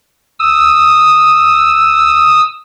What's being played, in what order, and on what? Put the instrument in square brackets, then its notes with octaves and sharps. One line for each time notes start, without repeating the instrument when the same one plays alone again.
[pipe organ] D#6 E6